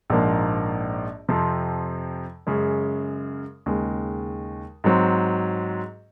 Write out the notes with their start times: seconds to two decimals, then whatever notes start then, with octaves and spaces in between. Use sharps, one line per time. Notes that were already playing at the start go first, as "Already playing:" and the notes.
0.10 A#1 G#2 F3 A#3
1.29 F2 C3 F3
2.47 F#2 C#3 G#3
3.66 D#2 C#3 G#3
4.84 G#2 F#3 C4